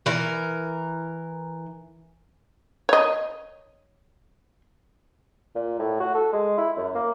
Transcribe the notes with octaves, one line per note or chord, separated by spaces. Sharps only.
E3 A#4
C#5 D#5
A#2
A2
F#4
A4
G#3
E4
F#2
A#3